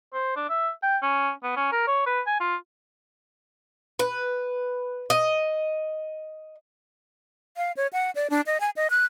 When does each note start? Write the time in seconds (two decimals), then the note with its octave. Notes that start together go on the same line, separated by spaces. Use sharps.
0.14 C5
0.37 D4
0.50 E5
0.83 G5
1.02 C#4
1.43 B3
1.57 C#4
1.72 A#4
1.87 C#5
2.06 B4
2.27 G#5
2.40 F4
3.99 B4
5.10 D#5
7.57 F5
7.77 C#5
7.93 F#5
8.15 D5
8.30 D4
8.46 D#5
8.60 G#5
8.76 D#5
8.90 F#6